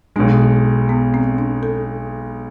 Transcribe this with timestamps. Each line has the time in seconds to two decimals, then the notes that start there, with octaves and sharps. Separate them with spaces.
0.16 B1 B2 G#3 D4
0.89 B3
1.14 C4
1.38 D4
1.63 A4